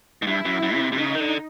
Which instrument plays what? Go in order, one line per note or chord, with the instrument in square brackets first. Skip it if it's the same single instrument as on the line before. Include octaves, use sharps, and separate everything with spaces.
[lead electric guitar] G#2
[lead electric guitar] G2 [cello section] E4
[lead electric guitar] F#2
F#2
C#3
C3
C3
[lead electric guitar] C#3 [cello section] D#4
[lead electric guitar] D#3
D3